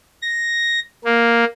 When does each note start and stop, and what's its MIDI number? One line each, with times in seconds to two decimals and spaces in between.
0.22 0.80 94
1.04 1.44 58